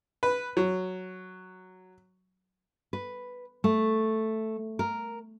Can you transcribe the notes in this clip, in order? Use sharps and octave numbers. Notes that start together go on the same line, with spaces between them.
B4
F#3
B4
A3
A#4